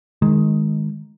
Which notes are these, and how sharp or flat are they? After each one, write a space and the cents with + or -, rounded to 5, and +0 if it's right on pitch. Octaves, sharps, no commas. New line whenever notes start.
D#3 +0 G#3 +10